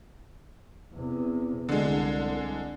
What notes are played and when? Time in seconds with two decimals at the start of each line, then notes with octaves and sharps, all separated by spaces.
0.94 E2 C3
1.69 C2 D3 G#3